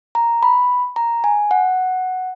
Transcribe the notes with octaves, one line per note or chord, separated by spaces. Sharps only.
A#5
B5
A#5
G#5
F#5